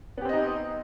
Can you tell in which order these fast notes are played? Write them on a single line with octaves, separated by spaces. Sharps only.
B3 G4 C4 D#5 D#4